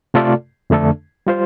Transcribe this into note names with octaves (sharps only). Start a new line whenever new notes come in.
C3 A3 F4 A4 D5
F2 D3 A3 D4 A4
G3 F4 C5